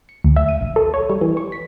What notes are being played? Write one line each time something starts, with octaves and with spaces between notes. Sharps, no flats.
C#7
D2
E5
D#7
A#1
A4
C#5
G3
E3
C#6
B6